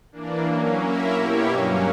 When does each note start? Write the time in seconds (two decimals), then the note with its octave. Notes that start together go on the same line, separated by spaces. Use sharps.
0.12 E3 A#3 D4
0.46 F#3 A#3 C#4
0.81 A#3 C#4 E4 A#4 E5
1.15 B2 A#3 E4 G4 C#5
1.48 G2 F#3 A#3 C#4